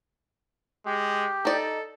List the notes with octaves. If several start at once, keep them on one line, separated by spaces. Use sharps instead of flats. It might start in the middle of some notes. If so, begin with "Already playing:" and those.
G#3 G4
D#4 A4 D5